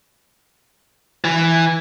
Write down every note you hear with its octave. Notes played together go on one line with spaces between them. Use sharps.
E3